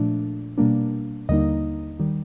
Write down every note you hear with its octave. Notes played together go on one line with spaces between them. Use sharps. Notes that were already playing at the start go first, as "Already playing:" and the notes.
Already playing: A#2 F3 A3 D4
B2 G3 A#3 D4
D#2 D3 G3 A#3 D#4 D#5
D#3 G3